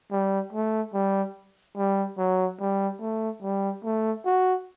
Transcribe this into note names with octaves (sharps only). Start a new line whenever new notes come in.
G3
A3
G3
G3
F#3
G3
A3
G3
A3
F#4